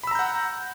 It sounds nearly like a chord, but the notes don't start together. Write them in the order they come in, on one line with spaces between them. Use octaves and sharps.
B5 E6 A#5 G6 F#5